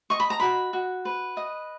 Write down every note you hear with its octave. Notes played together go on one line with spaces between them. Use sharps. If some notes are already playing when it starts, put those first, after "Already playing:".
D#5 C#6
B5
A#5
F#4 B5
F#4
B4
D#5